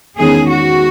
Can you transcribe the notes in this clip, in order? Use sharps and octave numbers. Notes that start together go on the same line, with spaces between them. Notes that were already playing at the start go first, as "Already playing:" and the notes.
E2 D#3 G#3 C#4 G#4
F#4